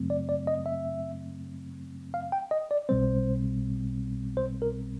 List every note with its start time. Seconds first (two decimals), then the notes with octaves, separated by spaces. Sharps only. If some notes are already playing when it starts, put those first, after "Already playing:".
Already playing: F#2 C#3 F#3 A3 C4
0.10 D5
0.29 D5
0.47 D#5
0.66 E5
2.14 F5
2.32 G5
2.51 D#5
2.71 D5
2.89 B1 B2 G3 C4 C5
4.37 C5
4.62 A#4